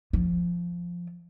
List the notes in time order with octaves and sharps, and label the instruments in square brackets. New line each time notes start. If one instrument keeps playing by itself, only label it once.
[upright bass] F3